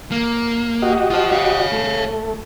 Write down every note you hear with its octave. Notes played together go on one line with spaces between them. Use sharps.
A#3
F#4 G4 D#5
F4 C5
C#5 F5
A3
A3